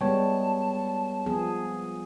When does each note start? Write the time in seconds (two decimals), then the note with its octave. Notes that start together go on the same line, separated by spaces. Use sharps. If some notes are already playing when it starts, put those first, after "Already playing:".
0.01 G3 G#3 B3 C#5 G5 A5
1.26 F3 B3 G#4